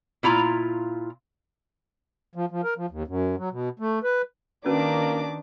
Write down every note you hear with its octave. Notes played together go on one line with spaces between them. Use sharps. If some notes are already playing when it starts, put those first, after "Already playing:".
A#2 E4 F4 A#5
F3
F3
A#4
F3
D#2
F#2
F#3
B2
A3
B4
D#3 A#3 C#4 D4 F#4 B4 D6